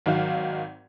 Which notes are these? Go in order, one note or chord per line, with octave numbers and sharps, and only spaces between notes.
G#1 D#3 F#3 F#4 F5